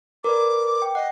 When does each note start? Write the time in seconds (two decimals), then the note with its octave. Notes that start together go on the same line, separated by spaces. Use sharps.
0.24 A#4 B4 D5 D6
0.82 G5
0.95 D#5 F#5